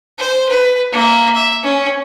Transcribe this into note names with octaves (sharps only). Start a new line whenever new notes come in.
C5
B4
A#3 E5
E5
C#4